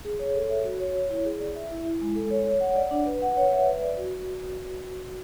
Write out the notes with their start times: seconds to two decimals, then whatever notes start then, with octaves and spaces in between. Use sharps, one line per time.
0.05 G#4
0.19 C#5
0.35 A4
0.50 E5
0.64 F#4
0.80 C#5
0.95 C#5
1.10 E4
1.25 G#4
1.40 D5
1.55 E5
1.71 E4
1.86 E4
2.01 G#3
2.15 A4
2.31 C#5
2.46 C#5
2.61 F#5
2.76 D5
2.91 D4
3.06 B4
3.22 F#5
3.37 C#5
3.52 E5
3.67 B4
3.82 D5
3.97 F#4